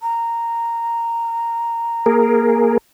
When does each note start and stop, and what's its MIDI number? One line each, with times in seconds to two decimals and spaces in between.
0.02 2.74 82
2.06 2.77 58
2.06 2.77 68
2.06 2.77 70